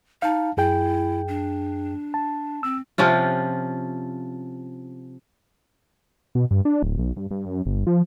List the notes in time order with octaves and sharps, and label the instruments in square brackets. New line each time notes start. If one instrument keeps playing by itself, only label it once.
[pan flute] D#4 [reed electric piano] F5 A5
[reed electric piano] F#2 G#4 G5 [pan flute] E4
[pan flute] D4
[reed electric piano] A5
[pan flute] C4 [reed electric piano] E6
[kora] C3 F3 C#4 F4
[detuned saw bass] B2
G2
D4
D1
B1
G2
G2
F#2
G1
F3